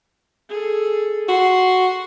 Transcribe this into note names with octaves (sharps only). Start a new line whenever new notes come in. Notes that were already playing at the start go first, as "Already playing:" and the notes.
G#4 A4
F#4 C6